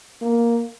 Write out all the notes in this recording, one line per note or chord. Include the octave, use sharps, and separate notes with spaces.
A#3